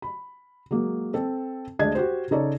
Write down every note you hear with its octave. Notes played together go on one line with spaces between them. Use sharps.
B5
F#3 G#3 A#3
C4 A4
D2 G#3 D4 D#5 G#6
F#4 G4 C5
C#3 D#4 A4 C#5 D5